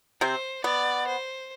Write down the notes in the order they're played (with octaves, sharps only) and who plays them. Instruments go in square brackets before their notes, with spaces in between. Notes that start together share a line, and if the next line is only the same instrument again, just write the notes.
[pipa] C3 C4 [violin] C5
[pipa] B3 [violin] D5
[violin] C5